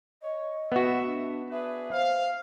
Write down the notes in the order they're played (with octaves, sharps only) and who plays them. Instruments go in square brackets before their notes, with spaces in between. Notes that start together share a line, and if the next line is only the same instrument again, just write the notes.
[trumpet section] C#5 [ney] D#5
[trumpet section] A3 E5 [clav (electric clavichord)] B3 F#4
[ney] D4
[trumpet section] D4 G#4 B4 [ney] E5
[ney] C5 [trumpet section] F5